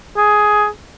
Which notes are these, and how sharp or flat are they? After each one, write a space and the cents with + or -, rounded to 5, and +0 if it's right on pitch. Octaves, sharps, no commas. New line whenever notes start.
G#4 +10